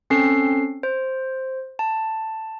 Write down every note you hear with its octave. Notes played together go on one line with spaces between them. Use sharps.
C4 C#4 A4 C7
C5
A5